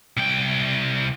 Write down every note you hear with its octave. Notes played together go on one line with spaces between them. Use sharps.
C2 G5